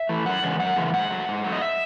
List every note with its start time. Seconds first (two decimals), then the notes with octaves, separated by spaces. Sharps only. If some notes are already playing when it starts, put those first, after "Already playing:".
Already playing: E5
0.09 E3 A3
0.25 F#2 F#5
0.43 C#3 E3 G#3
0.59 F#2 F#5
0.76 C#3 E3 G#3
0.93 G#2 F#5
1.10 F#3 A3
1.28 G#2
1.44 F#3 A3
1.52 D#5
1.62 E5